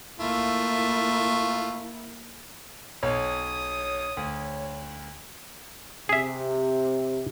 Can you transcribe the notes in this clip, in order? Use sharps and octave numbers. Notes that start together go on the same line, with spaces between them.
A3 A#3 E4 F4
B1 C#5 D#6
D2
C3 G#4 E5